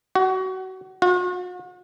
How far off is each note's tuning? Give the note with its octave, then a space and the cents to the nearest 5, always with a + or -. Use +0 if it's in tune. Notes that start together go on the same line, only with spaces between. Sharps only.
F#4 +25
F#4 -45